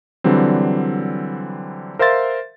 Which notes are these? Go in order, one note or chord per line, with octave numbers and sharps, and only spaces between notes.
D3 E3 F#3 G3 C4
A#4 C5 E5 F5 C6 A6